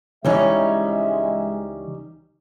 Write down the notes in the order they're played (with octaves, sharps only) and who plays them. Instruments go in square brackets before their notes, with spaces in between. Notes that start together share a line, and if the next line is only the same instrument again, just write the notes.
[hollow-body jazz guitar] C#2 E3 [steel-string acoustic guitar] G3 C#4 D#4 [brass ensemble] G#3 E5